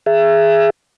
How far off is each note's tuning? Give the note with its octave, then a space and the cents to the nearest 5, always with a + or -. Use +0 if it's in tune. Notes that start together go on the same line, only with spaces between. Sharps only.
G#4 +0 E5 +25